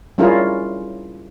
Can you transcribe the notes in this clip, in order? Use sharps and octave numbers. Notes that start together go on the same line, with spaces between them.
G3 C#4 E4 F4 G#4 A#4